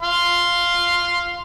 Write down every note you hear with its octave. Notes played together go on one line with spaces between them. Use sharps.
F5 C6